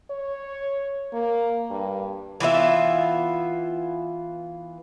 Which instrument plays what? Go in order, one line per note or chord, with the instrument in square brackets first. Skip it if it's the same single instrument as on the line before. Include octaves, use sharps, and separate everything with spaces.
[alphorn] C#5
A#3
G2
[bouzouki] E3 B3 F4 E5